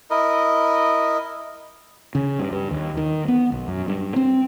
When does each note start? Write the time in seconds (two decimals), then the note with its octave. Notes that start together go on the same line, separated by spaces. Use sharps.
0.11 E4 A#4 D#5
2.15 C#3
2.39 G2
2.52 G2
2.71 D#2
2.97 D#3
3.28 B3
3.52 B1
3.68 F#2
3.88 G2
4.16 C4